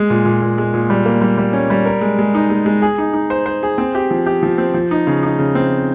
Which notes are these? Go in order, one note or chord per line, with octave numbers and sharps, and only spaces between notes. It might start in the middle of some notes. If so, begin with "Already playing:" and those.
Already playing: G#3 G#4
A#2
A#2
A#2
G#3
A#2
G3
A#3
G3
G3
C#4
G3
A#4
G#3
G#3
D#4
G#3
G#3
G#4
D#4
D#4
C5
C5
G#4
C4
G4
F3
G4
F3
C4
F3
D#4
C#3
D#4
C#3
C4